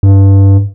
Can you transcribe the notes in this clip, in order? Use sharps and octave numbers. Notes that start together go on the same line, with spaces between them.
G2